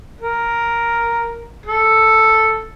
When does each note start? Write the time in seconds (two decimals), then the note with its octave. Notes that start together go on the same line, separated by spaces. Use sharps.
0.21 A#4
1.66 A4